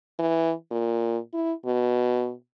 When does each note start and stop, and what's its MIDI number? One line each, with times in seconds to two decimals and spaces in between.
0.19 0.52 52
0.71 1.18 46
1.33 1.53 64
1.65 2.32 47